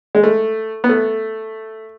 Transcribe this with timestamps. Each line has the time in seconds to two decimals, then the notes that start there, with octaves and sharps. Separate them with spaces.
0.15 G#3
0.24 A3
0.84 B3
0.89 A3